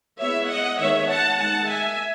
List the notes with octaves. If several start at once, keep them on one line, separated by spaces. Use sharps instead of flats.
G#3 B3 E4 C#5 E5
D#5 F#5
D#3 G#3 B3 C#5 E5
F#5 A5
D#3 G#3 D#4 F#5 A5
E5 G#5